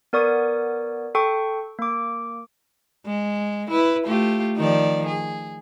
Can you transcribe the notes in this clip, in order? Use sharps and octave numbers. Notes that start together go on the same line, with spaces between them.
B3 A#4 D5 C#6 D#6 G#6
A4 G5 C#6
A#3 D6
G#3
E4 B4
A3 F4 G4
D#3 F3 D5
G#4